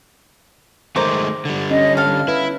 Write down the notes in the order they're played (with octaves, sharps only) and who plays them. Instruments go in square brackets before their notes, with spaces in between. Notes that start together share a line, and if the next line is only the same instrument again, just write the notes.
[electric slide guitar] D#3 G#3 A3 [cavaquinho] A#4 C5 D6
[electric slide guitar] D3 G3
[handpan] C#4 [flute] D#5
[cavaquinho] A4 F5 [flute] F6
[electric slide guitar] E4 [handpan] B4